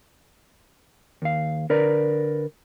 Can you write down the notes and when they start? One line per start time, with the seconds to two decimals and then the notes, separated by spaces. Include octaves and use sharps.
1.22 D#2 F5
1.70 D3 A#4 B4 D5 A#5